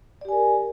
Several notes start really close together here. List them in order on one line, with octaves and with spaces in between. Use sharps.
D5 G4 G#5 A#4